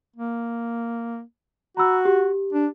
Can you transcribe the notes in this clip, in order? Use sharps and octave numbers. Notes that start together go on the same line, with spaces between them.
A#3
F#4 A#5 B5 E6
G4
D4